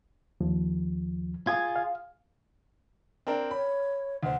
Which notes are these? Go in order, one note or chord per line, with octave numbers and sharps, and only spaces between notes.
D#2 F3
F4 G#4 G#6
F5
C4 D4 A#4
C#5 B5
D2 C5 F#5